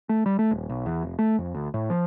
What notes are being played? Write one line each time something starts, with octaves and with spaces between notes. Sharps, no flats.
A3
G3
A3
D#1
B1
E2
F1
A3
F2
D2
A2
F3